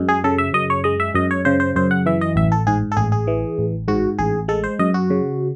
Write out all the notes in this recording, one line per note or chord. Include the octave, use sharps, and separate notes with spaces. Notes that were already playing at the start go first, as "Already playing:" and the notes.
Already playing: F#2 G#3
G#4
C#3 A4
E5
F#2 D#5
C#5
G#3 D#5
E5
F#2 D#5
C#5
C#3 C5
C5
F#2 C5
F#5
E3 E5
D#5
A1 E5
A4
G#2 G#4
A4
A1 G#4
G#4
E3
A1
G#2 F#4
A1 G#4
G#3 A4
C5
F#2 D#5
F#4
C#3